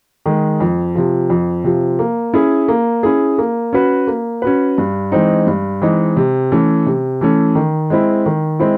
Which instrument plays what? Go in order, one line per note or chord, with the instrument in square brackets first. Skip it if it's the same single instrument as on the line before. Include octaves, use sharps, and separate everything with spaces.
[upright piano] D#3 G#3
F2
C3 F3
F2
C3 F3
A#3
C#4 E4 G#4
A#3
C#4 E4 G#4
A#3
C#4 F#4 B4
A#3
C#4 F#4 B4
G2
E3 G#3 C4 D#4
G2
E3 G#3 C4 D#4
C3
E3 A3 C#4
C3
E3 A3 C#4
D#3
G#3 C4 E4
D#3
G#3 C4 E4